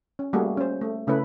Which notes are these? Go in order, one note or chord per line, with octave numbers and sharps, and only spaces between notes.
C#4
G3 A3 A#3 F#4 G#4
C#4 C5
A3
C#3 A3 C#4 E4 B4